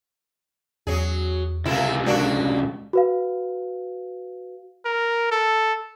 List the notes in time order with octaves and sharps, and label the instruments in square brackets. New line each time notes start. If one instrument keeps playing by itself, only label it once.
[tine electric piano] E2 [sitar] F#3 G#4
[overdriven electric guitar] C#2 C3 [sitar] A#3 E4
[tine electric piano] G#3 [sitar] A#3 D4 F#4
[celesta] F#4 B4 F5
[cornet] A#4
A4